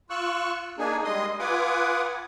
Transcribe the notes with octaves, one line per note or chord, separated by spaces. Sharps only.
F4 C#6 E6 F#6
A#3 D4 D#4 G#4 G#5
G3 G#3 D#5 C6 D#6
F4 B4 F#5 G#5 D6 D#6